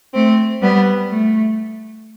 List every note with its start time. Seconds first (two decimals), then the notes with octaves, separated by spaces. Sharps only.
0.14 A3 C4
0.62 G3 B3
1.10 A3